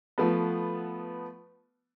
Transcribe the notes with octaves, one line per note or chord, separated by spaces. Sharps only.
F3 A3 B3